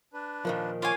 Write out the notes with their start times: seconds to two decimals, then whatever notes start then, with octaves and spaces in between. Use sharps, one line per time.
0.13 D4 B4
0.45 A#2 D#3 F3 A#4
0.82 F4 C#5 F5 G#5 D6